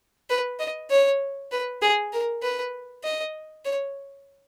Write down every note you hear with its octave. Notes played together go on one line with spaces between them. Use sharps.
B4
D#5
C#5
B4
G#4
A#4
B4
D#5
C#5